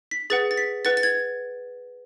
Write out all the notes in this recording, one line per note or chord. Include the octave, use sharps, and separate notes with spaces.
B6
G#4 B4 F#5 A6
A6
B6
B4 F#5 A6
A6
G#6